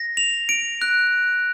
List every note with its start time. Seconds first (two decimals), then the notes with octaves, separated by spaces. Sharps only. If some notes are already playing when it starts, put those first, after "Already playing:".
Already playing: A#6
0.17 F7
0.49 D7
0.82 F#6